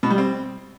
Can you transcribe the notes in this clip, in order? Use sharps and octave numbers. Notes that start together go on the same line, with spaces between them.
B2
G3
C4